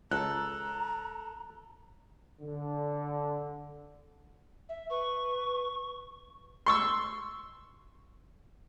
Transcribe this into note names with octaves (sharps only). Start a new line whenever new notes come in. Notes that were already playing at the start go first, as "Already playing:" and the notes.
C#2 A4 A#5 F#6
D3
E5
B4 C#6
C6 C#6 E6